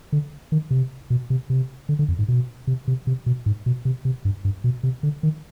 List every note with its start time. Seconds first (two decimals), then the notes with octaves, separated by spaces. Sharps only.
0.12 D3
0.52 D#3
0.71 C3
1.10 B2
1.30 C3
1.50 C3
1.89 D3
1.99 D3
2.08 F2
2.19 G#2
2.28 B2
2.67 C3
2.88 C3
3.07 C3
3.26 B2
3.46 G#2
3.66 B2
3.85 C3
4.05 C3
4.25 G2
4.45 G2
4.64 B2
4.83 C3
5.03 D3
5.23 D#3